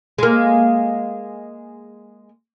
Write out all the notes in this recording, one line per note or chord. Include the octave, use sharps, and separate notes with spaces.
G#3 A#3